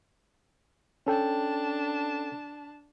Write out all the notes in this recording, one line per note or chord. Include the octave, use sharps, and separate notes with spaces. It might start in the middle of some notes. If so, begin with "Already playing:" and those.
C#4 D4 A4 G5 A5